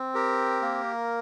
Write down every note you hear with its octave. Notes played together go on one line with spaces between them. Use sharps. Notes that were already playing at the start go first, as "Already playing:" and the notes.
Already playing: C4
G4 A#4
A#3